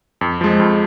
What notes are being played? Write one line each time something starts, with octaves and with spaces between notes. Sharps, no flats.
F2
F3 G#3
F2